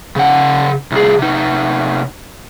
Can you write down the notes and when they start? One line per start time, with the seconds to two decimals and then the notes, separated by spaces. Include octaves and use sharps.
0.16 C#3 F#5
0.92 C2 G#4
1.19 C3 D#4